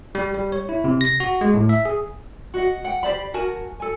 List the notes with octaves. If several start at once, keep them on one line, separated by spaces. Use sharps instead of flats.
G3
G3
C#5
E4
C3
A#6
F#4
G#3
A2
E5
G#4
F#4 D#5 F#5
F#5 G5
G4 C5 D5 B5
F#4 A#4 G#5 A5
A4 G#5